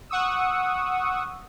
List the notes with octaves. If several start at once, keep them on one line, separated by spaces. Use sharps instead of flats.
F#5 C#6 D#6 E6